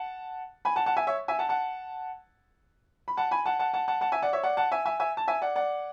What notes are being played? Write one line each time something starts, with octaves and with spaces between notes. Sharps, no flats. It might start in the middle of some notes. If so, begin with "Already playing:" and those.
Already playing: F#5 A5
G#5 B5
F#5 A5
F#5 A5
E5 G#5
C#5 E5
E5 G#5
F#5 A5
F#5 A5
B5
F#5 A5
G#5 B5
F#5 A5
F#5 A5
F#5 A5
F#5 A5
F#5 A5
E5 G#5
D5 F#5
C#5 E5
D5 F#5
F#5 A5
E5 G#5
E5 G#5
E5 G#5
A5
E5 G#5
D5 F#5
D5 F#5